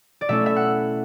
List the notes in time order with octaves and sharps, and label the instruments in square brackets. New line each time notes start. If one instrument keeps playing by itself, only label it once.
[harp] D5
B2 A3 C#4 E4 E5
E5
F#5